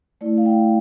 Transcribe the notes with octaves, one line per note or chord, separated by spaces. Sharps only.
A3 E4 D5
F5
G5